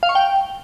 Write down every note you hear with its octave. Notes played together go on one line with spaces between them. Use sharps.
F5
C#6
G5